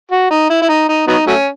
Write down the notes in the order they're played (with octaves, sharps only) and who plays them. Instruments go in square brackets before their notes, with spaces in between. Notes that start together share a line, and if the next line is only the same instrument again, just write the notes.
[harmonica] F#4
D#4
E4
E4
D#4
D#4
F#3 B3 D#4
F#3 A3 C#4